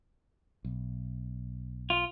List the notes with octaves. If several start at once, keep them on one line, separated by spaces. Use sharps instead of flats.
B1
F4